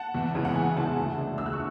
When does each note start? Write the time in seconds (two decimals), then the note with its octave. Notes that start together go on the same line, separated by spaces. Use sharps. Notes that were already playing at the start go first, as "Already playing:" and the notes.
Already playing: F#5 A5
0.15 E2
0.35 C#3 E3 G#3
0.45 F#5
0.55 E2 G#5
0.76 C#3 E3 G#3 F#5 A5
0.97 D2
1.17 C#3 G#3 D4
1.38 D2 E6
1.46 F#6
1.53 C#6 E6